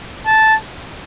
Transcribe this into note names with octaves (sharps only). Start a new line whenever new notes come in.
A5